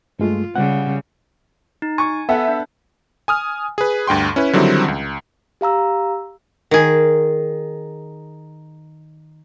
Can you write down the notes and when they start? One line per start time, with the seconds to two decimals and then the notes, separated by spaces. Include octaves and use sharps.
0.19 G2 G#3 A3 F4
0.56 C#3 G3 F#5
1.82 D#4
1.98 G#5 C#6
2.29 B3 A4 E5 F#5
2.48 D4
3.28 G#5 D#6 F6
3.78 G#4 B4
4.07 D2 G2 G5 C6
4.36 C#4 E4 B4
4.53 D3 D#3 F#3 G3 C4 E4
4.88 C#2
5.61 G4 F5 A#5 E6
6.71 D#3 G#4